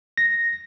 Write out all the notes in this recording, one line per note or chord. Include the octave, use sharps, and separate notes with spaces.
A#6